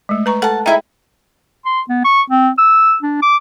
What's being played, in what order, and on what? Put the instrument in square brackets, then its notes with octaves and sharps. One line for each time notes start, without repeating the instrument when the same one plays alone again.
[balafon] G#3 A3
B4 A#5 C#6
[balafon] A4 [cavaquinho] F#5 A5
[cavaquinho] D#4 E4 E5 [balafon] G#4 G5
[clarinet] C6
B3
C#6
C4
E6
D4
D6